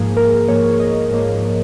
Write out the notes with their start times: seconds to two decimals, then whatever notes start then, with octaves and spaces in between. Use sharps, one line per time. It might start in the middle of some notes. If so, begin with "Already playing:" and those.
Already playing: G#2 F3 A#3 G#4
0.17 A#4
0.48 G#2 F3 A#3 C#5
0.74 C#5
0.80 D#5
1.11 G#2 F3 A#3